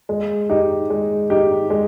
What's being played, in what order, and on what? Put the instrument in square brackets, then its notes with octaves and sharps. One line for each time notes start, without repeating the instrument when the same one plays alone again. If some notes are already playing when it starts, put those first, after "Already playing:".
[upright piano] G#3
D#4 G4
G#3
D#4 G4
G#3